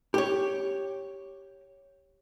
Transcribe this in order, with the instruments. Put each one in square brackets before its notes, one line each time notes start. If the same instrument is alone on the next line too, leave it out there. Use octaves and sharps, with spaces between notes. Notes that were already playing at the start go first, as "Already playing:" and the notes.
[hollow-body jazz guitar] G4 C#5